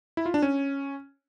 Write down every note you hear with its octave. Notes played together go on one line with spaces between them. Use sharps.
E4
F4
D4
C#4